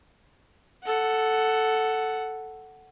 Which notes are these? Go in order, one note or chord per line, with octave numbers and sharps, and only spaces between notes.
A4 F#5